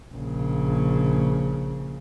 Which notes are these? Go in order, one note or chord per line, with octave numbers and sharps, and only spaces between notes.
A#1 C#3